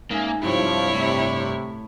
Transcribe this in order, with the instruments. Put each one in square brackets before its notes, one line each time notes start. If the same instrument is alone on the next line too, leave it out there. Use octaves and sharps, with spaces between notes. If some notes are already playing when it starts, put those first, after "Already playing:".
[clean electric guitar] G#2 [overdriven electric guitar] A#3 [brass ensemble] C#4 E5 G#5
[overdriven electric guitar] G2 [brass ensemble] C3 F3 [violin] E4 C#5
[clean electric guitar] A2 [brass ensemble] C3